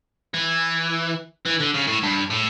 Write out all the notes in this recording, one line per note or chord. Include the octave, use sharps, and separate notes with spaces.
E3
E3
D3
C#3
A2
G2
A2